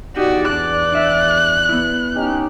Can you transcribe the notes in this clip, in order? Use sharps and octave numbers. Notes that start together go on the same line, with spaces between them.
E2 D#4 F#4 G4 D5
D4 F#6
D4 E5
B3 E4
C#4 D#4 G4